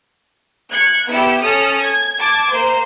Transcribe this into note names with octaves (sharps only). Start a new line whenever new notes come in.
F#6 G#6 C#7
B3 E4 G4 E6
C#4 A4 D#6 F6
G#6
A5 D6 G#6
A#3 C5